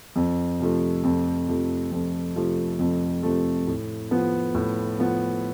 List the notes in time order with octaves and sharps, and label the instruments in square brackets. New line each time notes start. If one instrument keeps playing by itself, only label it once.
[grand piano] F2
C3 F3 A3
F2
C3 F3 A3
F2
C3 F3 A3
F2
C3 F3 A3
A2
F3 B3
A2
F3 B3